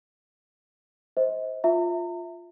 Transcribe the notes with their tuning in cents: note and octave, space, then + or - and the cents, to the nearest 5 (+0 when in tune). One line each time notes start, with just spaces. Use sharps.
C5 +0 D#5 +40
F4 +5 E5 +0 A#5 -40